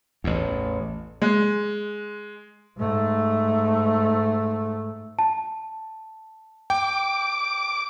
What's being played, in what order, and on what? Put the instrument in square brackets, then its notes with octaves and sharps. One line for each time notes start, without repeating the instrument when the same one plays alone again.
[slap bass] A1 E2
[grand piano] G#3
[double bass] G#2 A3
[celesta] A5
[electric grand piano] G5 [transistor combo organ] D6